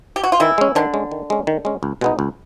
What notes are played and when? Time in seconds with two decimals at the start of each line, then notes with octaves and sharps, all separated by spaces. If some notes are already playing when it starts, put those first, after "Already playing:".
0.16 G4
0.23 F#4
0.32 F4
0.40 D#3 E3 E4
0.58 G#3 C#4
0.75 D3 D#3 D4
0.94 G#3 C#4
1.11 D#3
1.30 G#3 C#4
1.47 D#3
1.65 G#3 C#4
1.83 C#2
2.01 B2 G#3 B3 D#4
2.19 C#2